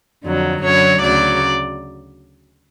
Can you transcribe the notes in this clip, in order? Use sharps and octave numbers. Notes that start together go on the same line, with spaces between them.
F2 D3 F#3
F#2 D3 F#3 C#5
D2 C#3 F#3 D5